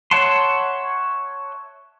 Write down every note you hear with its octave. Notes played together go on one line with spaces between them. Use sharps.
C#5 E5 F#5 A5 C6